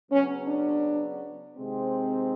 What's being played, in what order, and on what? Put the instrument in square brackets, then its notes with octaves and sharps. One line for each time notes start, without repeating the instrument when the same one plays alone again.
[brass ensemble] C#3 F#3 B3 C#4
D4
C3 D#3 G#3 C4